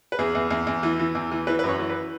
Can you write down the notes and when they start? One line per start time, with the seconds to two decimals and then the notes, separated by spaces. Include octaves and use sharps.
0.12 B4
0.19 E2 G#4
0.35 E2
0.51 E2
0.67 E2
0.83 E3
0.99 E3
1.15 E2
1.31 E3
1.47 E3 B4
1.59 B4
1.64 F#2 C#5
1.79 E3
1.90 B4